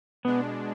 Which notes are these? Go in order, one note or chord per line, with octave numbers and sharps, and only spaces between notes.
B2 G#3 B3 D4